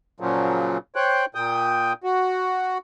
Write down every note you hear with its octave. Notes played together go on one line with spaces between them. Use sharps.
A#2 C#3 F3 F#3
C5 C#5 G5 F#6
A#2 G5 D#6
F#4